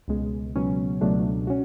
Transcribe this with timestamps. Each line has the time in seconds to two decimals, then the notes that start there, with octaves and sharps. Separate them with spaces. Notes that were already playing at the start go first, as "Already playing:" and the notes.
0.08 C#2 B2 G#3
0.56 C#2 B2 F#3 C#4
1.01 C#2 B2 F#3 A3 D4
1.47 C#4 F#4